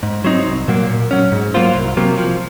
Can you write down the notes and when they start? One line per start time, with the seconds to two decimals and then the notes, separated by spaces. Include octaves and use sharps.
0.03 G#2
0.24 F#3 C4 D#4
0.46 C2
0.68 A#2 F#3 A#3
0.89 A#2
1.11 F#3 C#4
1.32 G#2
1.54 F#3 A#3 F4 C5
1.75 C2
1.97 C3 F#3 A#3
2.18 F3